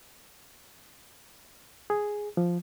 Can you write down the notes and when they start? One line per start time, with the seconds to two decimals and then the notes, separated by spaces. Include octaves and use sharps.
1.90 G#4
2.37 F3